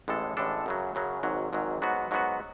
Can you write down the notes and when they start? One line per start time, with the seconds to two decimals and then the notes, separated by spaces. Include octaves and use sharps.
0.08 A1 A2 G#3 D4 A4
0.37 A1 A2 G#3 D4 A4
0.66 F#2 C#3 F#3
0.95 F#2 C#3 F#3
1.23 G#1 G#2 F#3
1.53 G#1 G#2 F#3
1.82 G#2 F#3 B3 F#4
2.11 G#2 F#3 B3 F#4